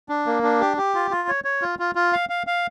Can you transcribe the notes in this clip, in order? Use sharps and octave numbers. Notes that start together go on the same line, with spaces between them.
D4
A#3
D4
G4
G4
F4
F4
C#5
C#5
F4
F4
F4
F5
F5
F5